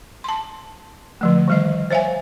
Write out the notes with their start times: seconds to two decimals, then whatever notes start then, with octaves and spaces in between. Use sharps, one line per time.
0.24 A5 C6
1.21 D3 F3 A3
1.48 D#3 G3 D#5
1.91 C5 C#5 E5 F5 G#5